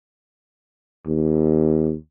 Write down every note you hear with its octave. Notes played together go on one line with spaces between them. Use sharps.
D#2